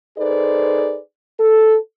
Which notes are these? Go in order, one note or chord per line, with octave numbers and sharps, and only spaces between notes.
D#4 G#4 A4 B4 C5 D5
A4